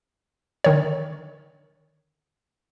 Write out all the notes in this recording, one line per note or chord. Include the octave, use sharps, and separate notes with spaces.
D3 D#3 C#5